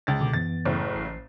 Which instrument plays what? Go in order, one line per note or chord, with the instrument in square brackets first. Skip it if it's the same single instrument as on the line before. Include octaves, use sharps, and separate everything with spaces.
[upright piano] C#2 A6
[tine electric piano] B2 D3 D6
[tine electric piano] F#2 E3 B3 [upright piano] A6
[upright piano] F#1 A2
[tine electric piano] A1 C7